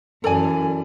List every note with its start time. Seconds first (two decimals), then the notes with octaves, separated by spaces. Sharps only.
0.24 F#2 E3 A4 D5 G#5